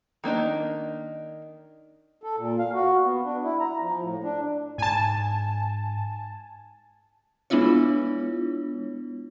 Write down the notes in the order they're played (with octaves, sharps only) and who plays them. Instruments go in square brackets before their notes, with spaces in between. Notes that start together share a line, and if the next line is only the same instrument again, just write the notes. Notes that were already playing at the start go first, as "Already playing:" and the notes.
[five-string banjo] D#3 A#3 D4 D#4
[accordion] A4
A#2
F5
F#4
B3
D4
E4
A#5
F3
A2
D4
[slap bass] G#2 [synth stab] G#5 A5
[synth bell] G#3 B3 D4 E4 F4 C#5